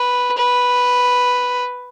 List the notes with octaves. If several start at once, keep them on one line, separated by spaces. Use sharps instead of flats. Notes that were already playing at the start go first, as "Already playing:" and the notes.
Already playing: B4
B4